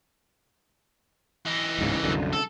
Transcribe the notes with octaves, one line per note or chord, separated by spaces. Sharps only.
E3 D#4
D1 G#2 C#3
C2 F#2 D3
A4